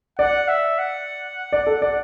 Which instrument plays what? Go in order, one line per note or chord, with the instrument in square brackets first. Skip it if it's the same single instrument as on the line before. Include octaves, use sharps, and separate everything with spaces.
[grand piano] D5 [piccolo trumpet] F#5
[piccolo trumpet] E5
F#5
[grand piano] D5
A4
D5